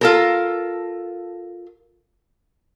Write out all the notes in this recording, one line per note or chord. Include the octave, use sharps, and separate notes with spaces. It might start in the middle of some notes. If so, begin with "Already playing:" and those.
F4 A4 A#4